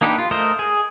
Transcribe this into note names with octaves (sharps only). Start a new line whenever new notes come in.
A#3 D4 D#4 G4 B4
F4
A3 A#4 C5 D#5
G#4